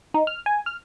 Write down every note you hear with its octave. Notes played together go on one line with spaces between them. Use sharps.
D#4
F6
G#5
F6